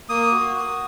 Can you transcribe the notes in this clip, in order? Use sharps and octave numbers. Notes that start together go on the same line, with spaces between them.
A#3 D#6
F#4
F#4